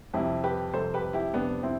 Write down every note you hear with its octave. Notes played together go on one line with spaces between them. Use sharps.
F2 C3 G3 E4 G4
G4 B4
F2 C3 G3 A4 C5
G4 B4
E4 G4
F2 C3 G3 B3 D4
C4 E4